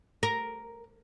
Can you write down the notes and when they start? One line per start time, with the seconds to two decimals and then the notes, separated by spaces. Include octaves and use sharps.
0.23 A#4